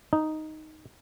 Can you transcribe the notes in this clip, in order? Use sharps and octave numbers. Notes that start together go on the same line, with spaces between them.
D#4